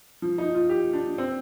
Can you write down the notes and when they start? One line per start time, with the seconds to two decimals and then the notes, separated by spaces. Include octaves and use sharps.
0.22 F3
0.38 D#4
0.55 F4
0.69 G4
0.93 D4
1.18 C4